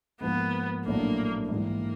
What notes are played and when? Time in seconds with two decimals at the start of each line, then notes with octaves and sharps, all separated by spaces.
0.21 G#2 F3 A#3 B3
0.85 A#1 A2 F#3 A#3 B3 D4
1.49 G#2 E3 G3 A#3